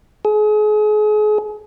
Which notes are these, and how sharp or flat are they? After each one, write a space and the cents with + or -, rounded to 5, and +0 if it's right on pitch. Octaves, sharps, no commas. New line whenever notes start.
G#4 +35